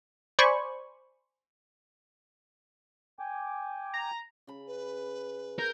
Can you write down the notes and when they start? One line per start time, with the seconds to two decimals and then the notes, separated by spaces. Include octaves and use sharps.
0.39 C5 D5 G#5 B5 C#6
3.19 G5 G#5 D6
3.94 A#5
4.47 C#3 B5
4.67 B4
5.59 A#4 G6